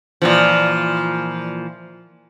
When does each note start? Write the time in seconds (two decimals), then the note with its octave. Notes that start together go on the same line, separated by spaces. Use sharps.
0.22 A#2 E3 F3